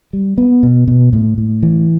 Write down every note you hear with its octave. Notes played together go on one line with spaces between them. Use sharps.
G3
B3
B2
B2
A2
A2
E3